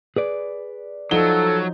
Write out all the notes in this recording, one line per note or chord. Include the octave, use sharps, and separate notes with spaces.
G#4 B4 D5
F3 F#3 D#4 A4 G7